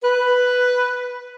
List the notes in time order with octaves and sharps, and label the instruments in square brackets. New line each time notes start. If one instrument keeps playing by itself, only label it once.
[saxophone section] B4